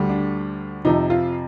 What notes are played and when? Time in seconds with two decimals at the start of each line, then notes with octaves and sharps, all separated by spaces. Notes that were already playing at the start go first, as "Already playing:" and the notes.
Already playing: D2 D3 G3
0.10 D4
0.85 F2 C3 F3 D#4
1.10 F4